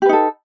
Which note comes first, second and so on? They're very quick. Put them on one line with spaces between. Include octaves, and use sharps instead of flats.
G4 B4 D#4 A4